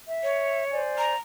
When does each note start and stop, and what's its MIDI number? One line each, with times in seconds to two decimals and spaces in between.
0.09 0.62 76
0.23 0.80 73
0.72 1.13 72
0.72 1.13 74
0.72 1.13 80
0.98 1.17 82